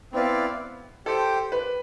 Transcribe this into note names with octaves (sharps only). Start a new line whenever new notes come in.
B3 C4 E4 B4 D5 F5
G4 A4 C5 G5
B4